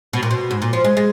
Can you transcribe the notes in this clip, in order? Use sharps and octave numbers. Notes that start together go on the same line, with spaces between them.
B2
A#2
B2
G#2
A#2
F3
G#3
G#3